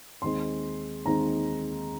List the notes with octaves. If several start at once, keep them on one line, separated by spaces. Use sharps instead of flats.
D#2 D#3 G#3 C4 C6
D#2 D#3 G#3 C4 A#5